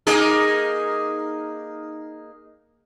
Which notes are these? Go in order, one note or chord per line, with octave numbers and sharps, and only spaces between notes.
A#3 D#4 G#4